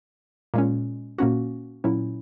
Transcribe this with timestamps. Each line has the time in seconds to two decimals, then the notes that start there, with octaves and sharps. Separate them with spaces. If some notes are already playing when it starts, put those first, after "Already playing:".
0.54 A#2 G#3 C#4
1.18 A#2 A#3 C#4 F#4
1.84 A#2 F#3 C#4 E4